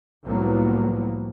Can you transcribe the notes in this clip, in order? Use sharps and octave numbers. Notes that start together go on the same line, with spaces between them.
C2 A2 F3 F#3 A#3 B3